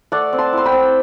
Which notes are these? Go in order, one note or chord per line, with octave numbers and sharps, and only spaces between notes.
A3 D5 F#5
C4
A5 C6
E4 C6
G5 B5
C4